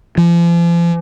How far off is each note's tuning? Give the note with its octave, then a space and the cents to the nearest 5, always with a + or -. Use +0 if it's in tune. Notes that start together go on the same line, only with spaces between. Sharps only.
F3 -40